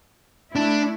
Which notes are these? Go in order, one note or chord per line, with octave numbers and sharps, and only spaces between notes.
A3 D4 E4